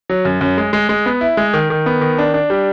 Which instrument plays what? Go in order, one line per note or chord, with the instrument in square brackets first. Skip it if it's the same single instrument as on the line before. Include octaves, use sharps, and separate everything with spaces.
[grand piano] F#3
F#2
F#2
G#3
G#3
G#3
B3
E4
G#3
D#3
D#3
B3
D#3
D4
D4
G3